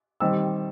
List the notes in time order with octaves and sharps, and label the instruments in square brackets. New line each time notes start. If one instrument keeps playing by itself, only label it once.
[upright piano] D#3 G3 C4 E6